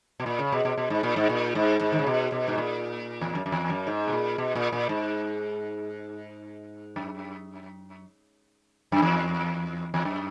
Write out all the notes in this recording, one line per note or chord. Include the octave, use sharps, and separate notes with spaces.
B2
A#2
C#3
B2
B2
B2
G#2
A#2
G#2
A#2
G#2
G#2
D#3
C#3
B2
B2
G#2
A#2
E2
F#2
F#2
E2
F#2
G#2
B2
A#2
B2
A#2
A#2
G#2
F#2
F#2
E2
E2
F#2